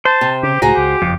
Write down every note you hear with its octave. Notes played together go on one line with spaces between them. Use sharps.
C5 A5
C3
C#3 G4
C#2 A2 F#4 G#4 A#5
C#2 G4
F#1 F2